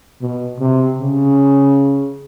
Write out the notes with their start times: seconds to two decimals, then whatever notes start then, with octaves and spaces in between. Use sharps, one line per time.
0.22 B2
0.60 C3
0.99 C#3